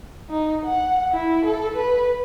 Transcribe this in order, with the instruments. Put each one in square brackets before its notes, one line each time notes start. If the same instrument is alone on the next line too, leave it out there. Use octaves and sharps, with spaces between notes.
[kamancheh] D#4
F#5
E4
A4
B4